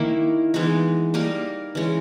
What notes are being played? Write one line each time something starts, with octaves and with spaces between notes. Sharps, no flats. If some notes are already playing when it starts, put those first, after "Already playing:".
Already playing: D#3 A#3 E4
E3 G#3 B3 D#4
G3 A#3 D#4 A#4
E3 G#3 C#4